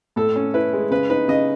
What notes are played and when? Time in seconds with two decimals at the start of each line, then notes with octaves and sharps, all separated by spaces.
0.16 A2 A4
0.36 C#4
0.54 E4 B4
0.73 G#3
0.91 C#3 B4
1.09 D#4 B4
1.28 C#3 D#5